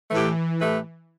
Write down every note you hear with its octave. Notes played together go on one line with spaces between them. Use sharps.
A2 E3 A3 G4 B4
A2 A3 G4 B4